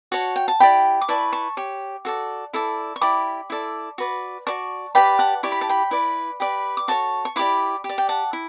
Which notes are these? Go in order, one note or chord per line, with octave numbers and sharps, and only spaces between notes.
F#4 C#5 F#5 A5
G5
A5
E4 G4 D5 G5 B5
D6
E4 B4 D5 A5 C#6
A5 C#6
G4 C#5
F#4 A4 D5
E4 A4 D5
C#6
E4 G4 D5 B5 D6
E4 A4 D5
F#4 B4 D5
F#4 B4 D5 A5 C#6
G4 B4 D5 G5 B5
F#5 A5
E4 G4 D5 C#6
B5
A5
G5 B5
E4 B4 D5
G4 B4 D5
D6
F#4 A4 C#5 A5 C#6
C#6
E4 G4 D5 B5 D6
G4
D5
G5
F#5 A5
E4